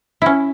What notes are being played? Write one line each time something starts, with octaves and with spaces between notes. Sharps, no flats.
C#4 E4